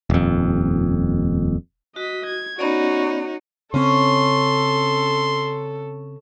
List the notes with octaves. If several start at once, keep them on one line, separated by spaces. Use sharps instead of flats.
D#1 F2
F#4 D#5 B6
G#6
B3 C#4 D#4 F#4 C#5 D5
C#3 C4 C#4 A4 C6